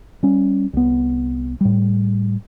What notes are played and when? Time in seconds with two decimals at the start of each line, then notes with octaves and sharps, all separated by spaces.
0.23 G3 C#4
0.73 C2 B3
1.61 A2 G3